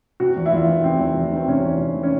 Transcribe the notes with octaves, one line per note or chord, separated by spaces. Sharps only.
C3 F#4
E2
E4
E2 F4
D#3
C3 C4
E2
E2
D#3 C4
C3 C#4
E2
C3
D#3
C#4